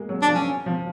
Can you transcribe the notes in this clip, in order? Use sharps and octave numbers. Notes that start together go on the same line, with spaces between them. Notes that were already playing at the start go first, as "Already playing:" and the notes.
Already playing: G#3 A#3
F#3
D4
F3
C#4
F3